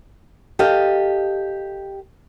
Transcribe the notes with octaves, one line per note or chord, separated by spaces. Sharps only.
G4 A4 D#5 F5